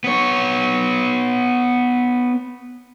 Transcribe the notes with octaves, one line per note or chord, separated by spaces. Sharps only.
B3 C#5